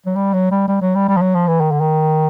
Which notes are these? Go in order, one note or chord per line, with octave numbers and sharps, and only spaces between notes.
F#3
G3
F#3
G3
G3
F#3
G3
G3
F3
F#3
F3
E3
D#3
D3
D#3